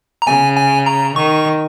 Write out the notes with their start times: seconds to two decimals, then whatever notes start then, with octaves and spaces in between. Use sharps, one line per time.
0.22 A#5
0.27 C#3 G#5
0.57 G#5
0.86 A#5
1.16 D#3 C#6